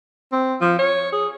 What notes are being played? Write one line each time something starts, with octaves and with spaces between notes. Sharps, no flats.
C4
F3
C#5
G#4